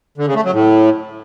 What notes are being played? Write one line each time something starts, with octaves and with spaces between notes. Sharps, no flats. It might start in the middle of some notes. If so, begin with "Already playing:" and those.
D3
C#3
A3
F#3
A2